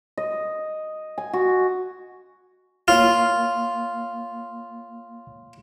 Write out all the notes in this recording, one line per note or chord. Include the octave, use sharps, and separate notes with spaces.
D#5
G#5
F#4
A#3 F4 C#5 F6